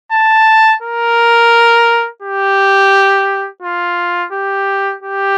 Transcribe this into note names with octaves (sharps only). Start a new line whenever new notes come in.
A5
A#4
G4
F4
G4
G4